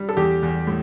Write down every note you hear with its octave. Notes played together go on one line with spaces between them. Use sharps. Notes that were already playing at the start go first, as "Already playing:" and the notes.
Already playing: G3
A4
E2 G4
E2
A2